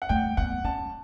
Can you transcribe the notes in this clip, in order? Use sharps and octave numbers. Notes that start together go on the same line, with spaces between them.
F#5
A3 G5
B3 F#5
C#4 A5